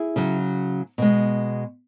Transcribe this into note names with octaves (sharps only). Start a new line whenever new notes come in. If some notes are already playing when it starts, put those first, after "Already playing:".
Already playing: E4 G#4
C#3 F#3
B2 G#3